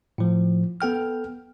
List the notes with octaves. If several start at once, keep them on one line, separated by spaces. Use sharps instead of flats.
A2 F3
B3 A4 G5 F6